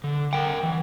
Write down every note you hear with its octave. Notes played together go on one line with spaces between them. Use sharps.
D3
A#4 F#5 G5
E3